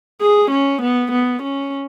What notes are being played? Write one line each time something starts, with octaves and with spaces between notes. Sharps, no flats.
G#4
C#4
B3
B3
C#4